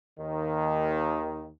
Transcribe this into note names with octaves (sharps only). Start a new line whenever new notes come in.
D#2 D#3